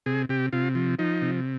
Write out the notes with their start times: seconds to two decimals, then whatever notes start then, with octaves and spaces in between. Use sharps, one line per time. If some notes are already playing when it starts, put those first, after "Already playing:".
0.06 C3 G#4
0.29 C3 G4
0.53 C3 F4
0.75 F3
0.99 F3 D#4
1.22 C3